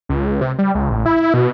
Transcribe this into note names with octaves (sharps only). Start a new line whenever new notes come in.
C#2
C3
G3
C#2
A1
E4
B2